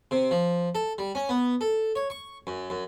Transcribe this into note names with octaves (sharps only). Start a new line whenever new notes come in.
C3
F3
A4
G3
C#4
B3
A4
C#5
C#6
F#2
F#2